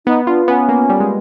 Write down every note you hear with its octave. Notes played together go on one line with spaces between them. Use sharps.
B3 D#4
D4 F4
B3 C#4
A#3
G3
G#3